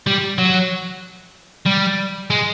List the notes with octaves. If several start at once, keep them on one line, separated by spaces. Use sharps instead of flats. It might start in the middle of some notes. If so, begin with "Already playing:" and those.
G3
F#3
G3
G#3